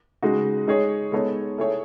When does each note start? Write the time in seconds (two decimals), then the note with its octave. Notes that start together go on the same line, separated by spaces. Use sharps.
0.22 C#3 G#3 D#4 F#4
0.67 G#3 D#4 G#4 C#5
1.12 G#3 B3 D#4 A4 C#5
1.58 A3 E4 G#4 C#5